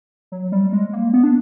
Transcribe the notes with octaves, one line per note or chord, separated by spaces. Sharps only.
F#3
G3
G#3
A#3
B3
D4